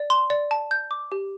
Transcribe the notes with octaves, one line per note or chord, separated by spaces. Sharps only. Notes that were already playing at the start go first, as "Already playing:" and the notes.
Already playing: D5
C6
D5
A5
G6
D6
G4